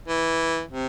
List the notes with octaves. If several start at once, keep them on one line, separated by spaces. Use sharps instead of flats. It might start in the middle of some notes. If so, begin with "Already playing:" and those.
E3
C3